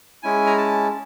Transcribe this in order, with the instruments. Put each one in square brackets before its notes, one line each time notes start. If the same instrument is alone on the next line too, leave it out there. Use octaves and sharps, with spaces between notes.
[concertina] G#3 C#4 E4 G#5
A#5
A5